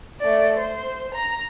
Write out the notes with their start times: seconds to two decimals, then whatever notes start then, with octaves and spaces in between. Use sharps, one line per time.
0.20 A3 D5
0.57 C5
1.14 A#5